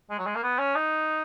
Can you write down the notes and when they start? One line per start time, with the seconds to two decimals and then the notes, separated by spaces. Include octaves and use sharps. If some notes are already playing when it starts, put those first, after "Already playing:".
0.10 G#3
0.19 F#3
0.26 G#3
0.35 A#3
0.43 B3
0.59 C#4
0.75 D#4